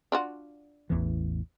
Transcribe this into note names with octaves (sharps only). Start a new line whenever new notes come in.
D4 F4 F#4
A1 E2 E3